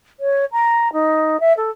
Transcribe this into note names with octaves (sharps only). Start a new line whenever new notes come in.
C#5
A#5
D#4
E5
A4